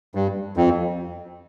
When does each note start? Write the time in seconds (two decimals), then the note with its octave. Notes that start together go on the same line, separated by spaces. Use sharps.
0.15 G2
0.57 F2